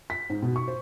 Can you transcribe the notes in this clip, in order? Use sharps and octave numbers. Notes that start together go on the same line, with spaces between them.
B6
G#2
B2
C#6
C5